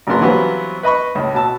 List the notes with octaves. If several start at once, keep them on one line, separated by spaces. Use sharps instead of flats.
G#1 C#3 F#3 A#3 B3 C6
E3 F#3 G3 B3 C4 F4
B4 D#5 B5 C#6
C#2 A2
B2 A5 E6